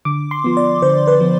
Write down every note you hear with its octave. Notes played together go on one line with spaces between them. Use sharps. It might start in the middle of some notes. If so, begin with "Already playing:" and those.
D3 D6
C6
F3 B3
D5
D3 C5
B4
F3 B3